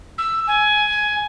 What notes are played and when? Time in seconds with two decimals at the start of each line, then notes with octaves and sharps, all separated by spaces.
0.18 E6
0.47 G#5